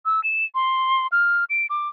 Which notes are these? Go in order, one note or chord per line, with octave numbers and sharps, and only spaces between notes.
E6
E7
C6
F6
D7
D6